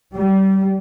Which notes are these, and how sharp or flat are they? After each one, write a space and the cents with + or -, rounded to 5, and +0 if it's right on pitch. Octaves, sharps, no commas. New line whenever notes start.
G3 -25